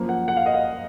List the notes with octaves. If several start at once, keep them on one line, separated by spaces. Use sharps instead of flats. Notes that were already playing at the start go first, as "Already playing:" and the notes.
Already playing: F#2 F3 A#3
F#5
F#5
F5
D#5
F5